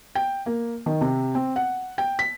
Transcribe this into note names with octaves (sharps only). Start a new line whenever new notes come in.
G5
A#3
D#3
C3
C4
F#5
G5
B6